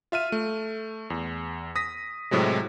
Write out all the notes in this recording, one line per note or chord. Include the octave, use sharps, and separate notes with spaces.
F4 E5 F6 D#7
A3
E2
D#6 A#6 B6
A2 C3 F#3 G#3